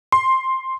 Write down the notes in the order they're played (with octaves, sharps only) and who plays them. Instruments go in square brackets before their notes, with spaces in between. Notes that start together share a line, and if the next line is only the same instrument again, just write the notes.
[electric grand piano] C6